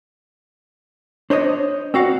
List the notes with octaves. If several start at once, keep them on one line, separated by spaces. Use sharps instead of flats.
D4 C5 C#5 D#5
C4 F#4 F5 F#5